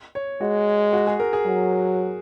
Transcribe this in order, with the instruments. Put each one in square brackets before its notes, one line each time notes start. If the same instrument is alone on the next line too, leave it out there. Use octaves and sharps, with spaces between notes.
[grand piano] C#5
[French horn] G#3 [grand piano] F#4
[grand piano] F#4
G#4
A#4
G#4
[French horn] F#3